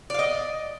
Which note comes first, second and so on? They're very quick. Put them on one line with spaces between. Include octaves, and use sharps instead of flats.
D5 F5 D#5